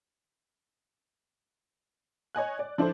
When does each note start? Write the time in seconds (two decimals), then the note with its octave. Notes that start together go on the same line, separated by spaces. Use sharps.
2.35 C#5 D#5 G#5 F#6
2.59 D5
2.78 F3 D4 E4 A4 C5